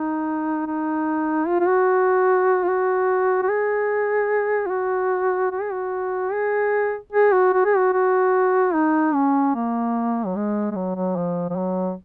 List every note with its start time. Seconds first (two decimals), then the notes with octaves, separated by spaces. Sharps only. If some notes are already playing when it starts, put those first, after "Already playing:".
Already playing: D#4
0.66 D#4
1.47 F4
1.60 F4
1.68 F#4
2.64 F4
2.69 F#4
3.43 F#4
3.49 G#4
4.66 F4
4.70 F#4
5.52 F#4
5.61 G#4
5.72 F#4
6.32 G#4
7.13 G#4
7.32 F#4
7.53 F#4
7.65 G#4
7.77 F#4
7.93 F#4
8.74 D#4
9.14 C#4
9.55 A#3
10.26 F#3
10.36 G#3
10.71 G#3
10.76 F#3
10.96 F#3
11.16 F3
11.50 F3
11.56 F#3